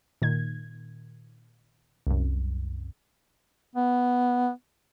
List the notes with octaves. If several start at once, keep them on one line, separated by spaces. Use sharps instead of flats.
A#2 D#3 G#6
C2 F#2
B3